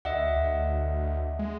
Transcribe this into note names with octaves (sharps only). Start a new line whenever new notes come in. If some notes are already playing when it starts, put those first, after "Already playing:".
D2 D#5 E5 F#5
D2
G#3